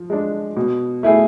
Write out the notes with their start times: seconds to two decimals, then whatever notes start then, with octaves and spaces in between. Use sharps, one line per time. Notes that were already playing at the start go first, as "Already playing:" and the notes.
Already playing: F3
0.10 G#3 D4
0.57 B2
1.03 A3 E4 G#4